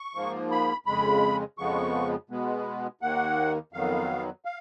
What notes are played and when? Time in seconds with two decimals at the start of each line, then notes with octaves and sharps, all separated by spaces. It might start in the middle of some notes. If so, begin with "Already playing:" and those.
Already playing: C#6
0.15 G#2 F3 A#3
0.51 B5
0.86 F2 C#3 G#3 B5
1.58 F2 C#3 F3 G#3 B3 C#6
2.30 B2 G#3 B3
3.01 D#2 D#3 A#3 F#5
3.73 F2 D#3 F#3 B3 F5
4.45 F5